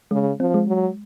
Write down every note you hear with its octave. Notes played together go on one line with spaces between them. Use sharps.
C#3 G#3
F3 C4
G#3
F#3